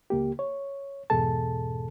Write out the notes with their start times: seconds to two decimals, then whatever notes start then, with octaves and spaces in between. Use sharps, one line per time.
0.10 C#2 A#3 G4
0.39 C#5
1.10 E2 G#2 B2 G#4 A4 A5